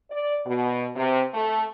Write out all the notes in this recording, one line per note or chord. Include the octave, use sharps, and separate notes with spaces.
D5
B2
C3
A3